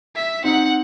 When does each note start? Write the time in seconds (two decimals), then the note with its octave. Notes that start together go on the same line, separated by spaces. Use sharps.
0.15 E5
0.44 C4 D#4 F#5